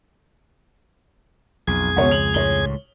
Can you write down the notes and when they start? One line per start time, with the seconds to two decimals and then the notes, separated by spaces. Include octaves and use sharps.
1.67 B1 F2 G#4 G#6
1.96 C#2 B2 C#5 F#5
2.11 F7 F#7
2.34 C#2 A2 C#5 G7